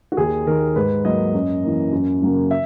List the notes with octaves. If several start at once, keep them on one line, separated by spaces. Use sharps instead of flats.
F#4
D#2 G#4
D#3 A#3 A#4
G#2 B4
F#3 A#3 D#5
F#2
E3 A#3
F#2
C#3 F#3 A#3
E5